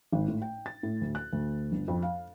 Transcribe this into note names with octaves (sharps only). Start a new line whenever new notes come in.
G#1
A2
G5
A6
A2
D2
F#6
D2
G1
F2
F5